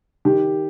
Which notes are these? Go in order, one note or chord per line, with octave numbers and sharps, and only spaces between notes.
D#3 G4